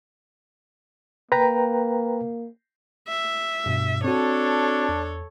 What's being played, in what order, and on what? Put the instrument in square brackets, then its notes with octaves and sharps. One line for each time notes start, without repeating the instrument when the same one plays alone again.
[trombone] A#3 [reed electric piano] B4 G5 A#5
[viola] E5
[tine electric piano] G2 B2
[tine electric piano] C4 F#4 [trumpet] D4 [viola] A4 C#5
[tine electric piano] E2